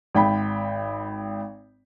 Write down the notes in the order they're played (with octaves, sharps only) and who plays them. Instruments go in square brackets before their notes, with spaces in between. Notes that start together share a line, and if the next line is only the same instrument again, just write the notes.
[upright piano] G#1 G5 B5